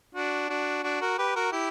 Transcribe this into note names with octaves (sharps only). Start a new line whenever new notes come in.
D4 F#4
D4 F#4
D4 F#4
F#4 A#4
G4 B4
F#4 A#4
E4 G4